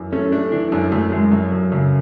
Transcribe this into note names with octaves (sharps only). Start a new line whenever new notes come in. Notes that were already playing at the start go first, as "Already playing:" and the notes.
Already playing: F#2 E3
A3 C#4
A3 D4
E3 D4
F#2 D4
F#2 A3
F#2 G#3
F#2 F#3
F#2
F#2 C#3